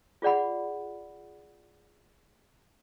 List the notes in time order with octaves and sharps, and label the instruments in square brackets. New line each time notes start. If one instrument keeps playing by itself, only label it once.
[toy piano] F4 G#4 D5 F#5 B5